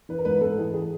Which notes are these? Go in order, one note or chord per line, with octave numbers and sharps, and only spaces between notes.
E3 B4
A#4
G#2 B4
G#2 A4
E3 G#4
G#4